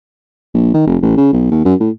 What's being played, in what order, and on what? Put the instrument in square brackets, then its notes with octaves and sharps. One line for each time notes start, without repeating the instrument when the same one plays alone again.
[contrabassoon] A#1
D#3
F1
A1
C#3
B1
D#2
F#2
A2